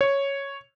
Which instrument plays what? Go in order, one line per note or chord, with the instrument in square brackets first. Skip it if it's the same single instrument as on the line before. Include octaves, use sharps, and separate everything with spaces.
[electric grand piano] C#5